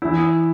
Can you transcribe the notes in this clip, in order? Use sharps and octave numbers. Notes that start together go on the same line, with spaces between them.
E3 E4